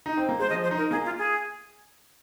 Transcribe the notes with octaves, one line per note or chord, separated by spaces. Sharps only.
D#4
C4
A#3
G#3 C5
F3 D#5
C5
D#4
A#4
A#3 G#4
F4
G#4